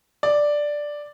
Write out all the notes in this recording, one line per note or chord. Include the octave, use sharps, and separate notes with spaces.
D5